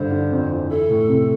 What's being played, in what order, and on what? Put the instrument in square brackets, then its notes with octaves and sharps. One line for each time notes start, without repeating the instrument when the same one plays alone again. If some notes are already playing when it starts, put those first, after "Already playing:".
Already playing: [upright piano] G2 D3 [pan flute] C5
[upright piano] D3
F2
E3
[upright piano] E4 [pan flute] A4
[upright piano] A2
C3